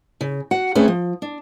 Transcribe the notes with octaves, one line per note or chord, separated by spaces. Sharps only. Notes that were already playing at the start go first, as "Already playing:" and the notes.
C#3
F#4 F#5
A3 C4 C#4 G#4 B4
F3
D4